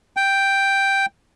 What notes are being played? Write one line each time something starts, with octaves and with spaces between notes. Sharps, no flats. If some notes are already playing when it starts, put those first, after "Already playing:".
G5